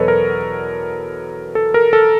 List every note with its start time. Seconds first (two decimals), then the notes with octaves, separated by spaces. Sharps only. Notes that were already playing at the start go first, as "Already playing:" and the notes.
Already playing: E2 B2 F#3 A4 B4 C#5 D#5
0.08 A#4
1.55 A4
1.74 A#4
1.93 A4